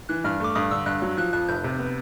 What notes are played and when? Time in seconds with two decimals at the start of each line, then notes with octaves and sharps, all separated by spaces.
0.09 E3 F#6
0.24 G2 F6
0.40 A3 D6
0.55 G2 D#6
0.71 D3 E6
0.86 G2 F#6
1.02 F#3
1.17 F3 F#6
1.33 F2 F#6
1.48 F1 G6
1.64 C3
1.79 B3